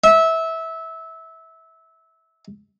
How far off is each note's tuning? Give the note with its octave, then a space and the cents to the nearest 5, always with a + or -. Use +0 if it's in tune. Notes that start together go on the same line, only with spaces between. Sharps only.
E5 -20